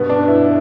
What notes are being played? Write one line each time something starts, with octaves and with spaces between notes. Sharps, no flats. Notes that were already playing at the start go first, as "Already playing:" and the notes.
Already playing: G2 B2 B3
D4
G2
E4